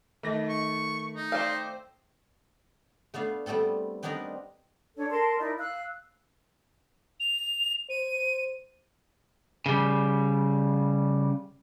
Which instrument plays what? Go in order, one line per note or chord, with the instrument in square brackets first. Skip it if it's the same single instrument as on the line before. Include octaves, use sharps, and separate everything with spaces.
[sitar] D#3 [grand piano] A3 A#6
[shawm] C#6
D#4
[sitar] C4 C5 [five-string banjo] D5 F5
[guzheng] A3 B3 D4 F5
G3 A3 B3 C4 A4
B3 C4 D4 D#4 A#4 B4
[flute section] D4 A4 C#5
A4 A#4 A5 C6
D#4 E4 A#4 D5
F5 E6 F#6
[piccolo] F7
[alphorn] C5 [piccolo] D#7
[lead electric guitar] C#3 G3